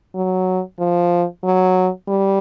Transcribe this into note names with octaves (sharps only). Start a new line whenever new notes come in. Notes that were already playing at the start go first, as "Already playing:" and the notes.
F#3
F3
F#3
G3